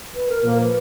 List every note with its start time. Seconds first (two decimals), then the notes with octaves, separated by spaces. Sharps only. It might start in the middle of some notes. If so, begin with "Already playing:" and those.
0.15 B4
0.29 A#4
0.43 A#2 F3 A#3 A#4
0.53 A#4
0.62 B4